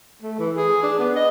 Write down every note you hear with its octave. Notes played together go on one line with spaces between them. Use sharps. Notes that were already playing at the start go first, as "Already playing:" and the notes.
A3
E3
G#4
D4
B3
D#5